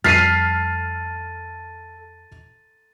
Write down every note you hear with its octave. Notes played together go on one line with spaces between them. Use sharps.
F2 G3 A4 F6 A6 B6 C7 D#7